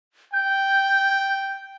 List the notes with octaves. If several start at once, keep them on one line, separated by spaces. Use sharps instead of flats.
G5 G6